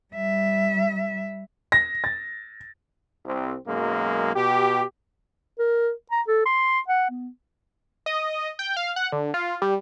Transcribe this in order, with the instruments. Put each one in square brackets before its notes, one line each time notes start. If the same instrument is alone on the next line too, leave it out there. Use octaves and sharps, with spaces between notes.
[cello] G3 E5
[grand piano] A#6
A6
[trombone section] C2 C4
B1 F#2 G#3 A#3
B2 G4
[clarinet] A#4
A#5
A4
C6
F#5
B3
[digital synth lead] D#5
G5
F5
F#5
D3
F4
G3